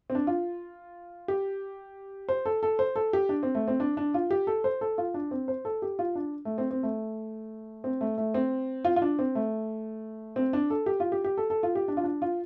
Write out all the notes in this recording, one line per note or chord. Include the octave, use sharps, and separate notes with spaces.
C4
D4
F4
G4
C5
A4
A4
C5
A4
G4
D4
C4
A3
C4
D4
D4
F4
G4
A4
C5
A4
F4
D4
C4
C5
A4
G4
F4
D4
A3
C4
C4
A3
C4
A3
A3
C4
F4
F4
D4
C4
A3
C4
D4
A4
G4
F4
G4
G4
A4
A4
F4
G4
D4
F4
D4
F4